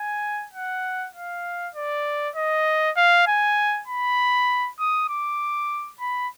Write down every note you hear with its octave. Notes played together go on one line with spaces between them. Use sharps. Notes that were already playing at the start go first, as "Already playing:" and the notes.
Already playing: G#5
F#5
F5
D5
D#5
F5
G#5
B5
D#6
D6
B5